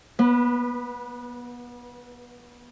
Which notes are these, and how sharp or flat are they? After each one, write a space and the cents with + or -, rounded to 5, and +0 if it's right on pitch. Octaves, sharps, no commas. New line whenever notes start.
B3 -30 B4 +0